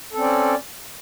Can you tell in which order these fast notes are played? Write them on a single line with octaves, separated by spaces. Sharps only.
A4 C4 C#4 D5